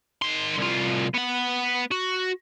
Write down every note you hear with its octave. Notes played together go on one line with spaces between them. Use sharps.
D#3 C6
C2 F4
B3 F#5
F#4